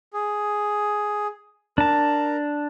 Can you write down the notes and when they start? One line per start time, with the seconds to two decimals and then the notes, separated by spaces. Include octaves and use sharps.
0.13 G#4
1.78 D4 A#4 A5